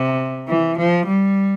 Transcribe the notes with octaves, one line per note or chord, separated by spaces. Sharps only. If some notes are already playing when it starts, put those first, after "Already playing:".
Already playing: C3
E3
F3
G3